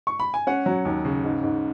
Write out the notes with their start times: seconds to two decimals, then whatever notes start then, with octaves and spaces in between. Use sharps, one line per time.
0.07 C#6
0.20 B5
0.34 G#5
0.47 C#4 F#5
0.66 F#3
0.85 D#2
1.05 C#3
1.24 G#2
1.43 G#2